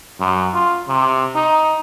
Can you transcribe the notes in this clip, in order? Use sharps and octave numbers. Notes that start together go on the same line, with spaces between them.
F#2
F4
C3
D#4